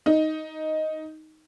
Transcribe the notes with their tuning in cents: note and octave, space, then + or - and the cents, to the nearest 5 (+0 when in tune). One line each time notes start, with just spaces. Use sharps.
D#4 +5